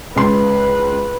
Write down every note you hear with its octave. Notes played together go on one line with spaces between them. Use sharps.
C#2 B4 C6